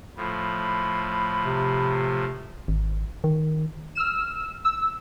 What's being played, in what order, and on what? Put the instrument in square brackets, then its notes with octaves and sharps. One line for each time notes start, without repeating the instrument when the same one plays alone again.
[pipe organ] A2 F3 [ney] B5
[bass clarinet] C3
[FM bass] G#1
D#3
[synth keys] E6 F6 E7
E6